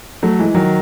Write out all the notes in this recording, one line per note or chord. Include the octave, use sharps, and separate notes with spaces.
F#3 A3
E3 G#3
D#3 F#3